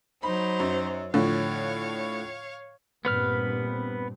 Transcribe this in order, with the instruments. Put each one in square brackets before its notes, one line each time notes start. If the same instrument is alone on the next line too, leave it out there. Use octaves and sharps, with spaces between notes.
[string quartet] F#3 D#4 C5 [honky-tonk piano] B5
[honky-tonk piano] F#2
[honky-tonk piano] A2 D3 F3 [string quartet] C#5 F5
[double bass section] G2 A#2 C4 [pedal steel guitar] B3 B4 F6